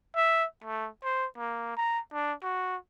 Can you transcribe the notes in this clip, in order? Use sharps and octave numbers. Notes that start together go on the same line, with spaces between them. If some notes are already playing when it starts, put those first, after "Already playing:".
E5
A3
C5
A#3
A#5
D4
F#4